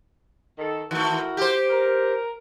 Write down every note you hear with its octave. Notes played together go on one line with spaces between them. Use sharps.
D#3 A4
D#3 A3 E4 F#4 A#4
G4 C5
A#4